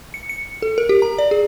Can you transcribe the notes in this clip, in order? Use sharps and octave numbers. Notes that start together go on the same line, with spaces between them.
C#7
C#7
A4
A#4
G4
A#5
D5
G#4